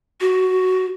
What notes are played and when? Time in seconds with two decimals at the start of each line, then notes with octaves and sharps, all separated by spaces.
0.21 F#4